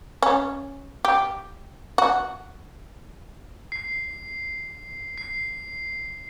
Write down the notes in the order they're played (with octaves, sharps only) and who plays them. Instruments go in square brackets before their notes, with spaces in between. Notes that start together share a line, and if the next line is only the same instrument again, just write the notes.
[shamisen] C#4
G4
F#4
[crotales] C7
C7